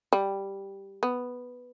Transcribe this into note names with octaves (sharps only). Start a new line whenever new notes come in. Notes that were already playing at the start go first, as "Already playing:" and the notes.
G3
B3